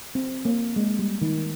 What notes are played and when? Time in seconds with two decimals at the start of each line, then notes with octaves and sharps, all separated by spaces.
0.15 C4
0.45 A#3
0.76 G#3
0.99 G3
1.22 D#3